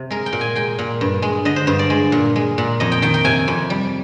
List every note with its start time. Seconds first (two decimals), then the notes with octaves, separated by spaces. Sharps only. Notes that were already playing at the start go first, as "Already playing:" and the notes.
Already playing: C3 C4
0.10 G#3 A#4
0.26 G5
0.32 A#2
0.41 G#5
0.55 G#3 G5
0.79 A#2
1.01 G2
1.22 G#3
1.45 D3 D#5
1.56 C5
1.67 G2 C5
1.79 D5
1.90 G#3
2.12 A#2
2.36 G#3
2.58 A#2
2.80 F2 D#5
2.92 G5
3.02 D#3 G5
3.14 G5
3.25 C3 G#5
3.48 F2
3.70 G3